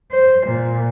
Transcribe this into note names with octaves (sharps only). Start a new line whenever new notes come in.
C5
A#2